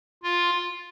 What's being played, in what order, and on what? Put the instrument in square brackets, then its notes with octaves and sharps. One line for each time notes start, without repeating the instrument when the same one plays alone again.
[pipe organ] F4